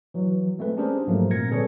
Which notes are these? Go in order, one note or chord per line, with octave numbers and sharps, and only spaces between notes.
E3 F#3
G#3 A3 C4 B4
C#4 D4 G4 G#4 A#4 C5
G#2 F3 F#3 A3 A#3 D#4
A#2 C4 A#4 G#6 A#6 C#7
D3 G3 G#4 A4 B4 C#5